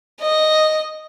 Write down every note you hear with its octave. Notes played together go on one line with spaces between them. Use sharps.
D#5